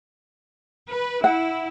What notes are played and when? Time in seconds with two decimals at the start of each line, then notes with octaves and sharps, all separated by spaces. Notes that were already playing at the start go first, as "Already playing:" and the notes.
0.89 B4
1.24 E4 F#5